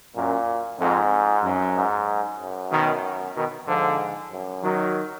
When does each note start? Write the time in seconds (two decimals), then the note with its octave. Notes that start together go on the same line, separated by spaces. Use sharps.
0.16 F#2 A#2
0.80 F2 G#2
1.44 F#2
1.76 G#2
2.40 F#2
2.72 B2 D#3
3.36 B2 D#3
3.68 G#2 D3 F3
4.32 F#2
4.64 D#3 F#3